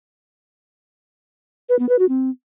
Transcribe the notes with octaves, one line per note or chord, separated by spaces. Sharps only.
B4
B3
B4
F#4
C4